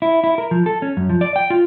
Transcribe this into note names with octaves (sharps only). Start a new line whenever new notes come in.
E4
E4
A#4
F3
A4
C#4
F#2
F3
D5
G5
F4